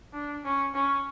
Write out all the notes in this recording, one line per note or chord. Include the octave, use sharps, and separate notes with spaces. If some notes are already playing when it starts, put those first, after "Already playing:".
D4
C#4
C#4